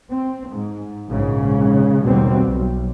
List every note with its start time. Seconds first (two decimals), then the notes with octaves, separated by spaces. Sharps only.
0.10 C4
0.49 G#2
1.09 A#1 G#2 C#3
2.05 D#2 B2 G3 C4
2.44 B1